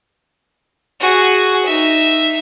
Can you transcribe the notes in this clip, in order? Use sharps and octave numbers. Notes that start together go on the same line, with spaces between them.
F#4 G#4
D#4 E5